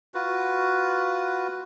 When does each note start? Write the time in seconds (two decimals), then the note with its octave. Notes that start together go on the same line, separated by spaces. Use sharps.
0.14 F4 F#4 B4